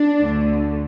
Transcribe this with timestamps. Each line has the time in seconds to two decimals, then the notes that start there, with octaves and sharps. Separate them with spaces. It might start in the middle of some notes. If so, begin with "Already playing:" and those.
Already playing: D4
0.20 D2 D3 A3